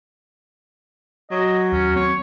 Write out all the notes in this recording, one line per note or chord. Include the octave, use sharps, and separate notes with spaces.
F#3 D#5
D#2 C#4
C4 C#5